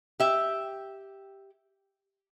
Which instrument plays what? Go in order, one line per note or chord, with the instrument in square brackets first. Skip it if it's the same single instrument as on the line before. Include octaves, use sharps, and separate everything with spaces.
[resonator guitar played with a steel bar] G4 E5